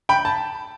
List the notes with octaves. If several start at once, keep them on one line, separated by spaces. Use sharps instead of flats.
G5 B5
A5